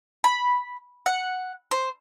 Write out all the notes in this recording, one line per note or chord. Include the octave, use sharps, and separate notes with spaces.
B5
F#5
C5